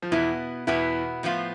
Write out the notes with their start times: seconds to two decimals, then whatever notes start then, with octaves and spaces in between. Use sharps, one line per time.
0.02 F3
0.11 E2 B2 E3 B3 E4
0.67 E2 B2 E3 B3 E4
1.23 A2 F3 B3 F4